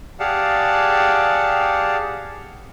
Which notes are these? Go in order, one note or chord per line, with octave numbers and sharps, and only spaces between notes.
G4 G#4 D5 F5 F#5 A5